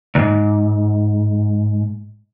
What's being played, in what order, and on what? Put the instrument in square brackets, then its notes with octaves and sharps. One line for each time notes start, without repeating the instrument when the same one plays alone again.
[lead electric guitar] C2 G#2